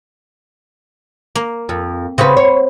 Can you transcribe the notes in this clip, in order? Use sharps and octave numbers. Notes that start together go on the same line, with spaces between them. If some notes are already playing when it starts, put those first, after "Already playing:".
A#3
F2
C#3 C4 F#4 B4
C#5